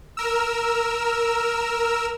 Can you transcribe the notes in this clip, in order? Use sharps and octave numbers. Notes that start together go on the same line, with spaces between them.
A#4 E6